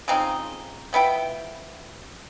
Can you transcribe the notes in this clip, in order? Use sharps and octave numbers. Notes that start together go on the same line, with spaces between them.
C#3 F3 C4 D#4
F3 B3 E4 G5